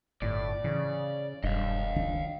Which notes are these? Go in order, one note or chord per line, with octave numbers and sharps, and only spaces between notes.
G1 A2 D5
C#3 E3
E1 G2 D#5 F5
C#2 D#3 D4